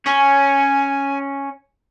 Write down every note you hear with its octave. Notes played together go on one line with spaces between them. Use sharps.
C#4 G#5